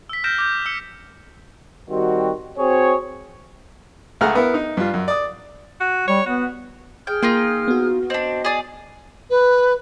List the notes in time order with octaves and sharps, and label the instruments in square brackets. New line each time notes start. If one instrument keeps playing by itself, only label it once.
[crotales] E6 B6
F6 G6 A#6 D7 E7
D6 G6 A#6
E6 C#7
[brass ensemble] D#3 G3 C4 F#4
C4 F#4 G#4 C#5
[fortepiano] C#2 A3 G#4 F#5 A#5 F6
B3 E4 A#4
D#4
G2 F4
F#2
D5 D#6
[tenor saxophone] F#4
[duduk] G3 [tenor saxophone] C#5
[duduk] B3 [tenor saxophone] F#4
[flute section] G#4 D#6 F6 [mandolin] G5
[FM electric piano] A#3 [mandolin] D#4 F4 G5
[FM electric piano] B3 F#4
[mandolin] C4 D4 [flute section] D#5
[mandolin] G#4 D5
[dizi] B4